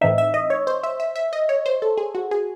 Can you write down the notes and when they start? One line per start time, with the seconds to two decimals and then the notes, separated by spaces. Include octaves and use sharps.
0.01 A2 E3 C4 D#4 E5
0.18 E5
0.34 D#5
0.50 C#5
0.67 C5
0.83 E5
1.00 E5
1.16 E5
1.33 D#5
1.49 C#5
1.66 C5
1.82 A4
1.98 G#4
2.15 F#4
2.31 G#4